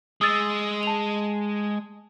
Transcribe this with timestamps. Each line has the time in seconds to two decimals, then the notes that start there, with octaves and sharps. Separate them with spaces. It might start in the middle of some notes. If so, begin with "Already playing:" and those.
0.21 G#3 D#6 E6 A6
0.83 A5 F7